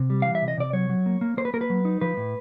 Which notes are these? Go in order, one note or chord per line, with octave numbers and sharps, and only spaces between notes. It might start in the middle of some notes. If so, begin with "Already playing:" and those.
Already playing: C3
G3
E3 F5
E5
C3
D#5
C3 D5
F#3 C#5
F#3
A#3
A#3
A#3 C5
B4
A#3 A#4
B4
F#3
D#4
F3 B4
A2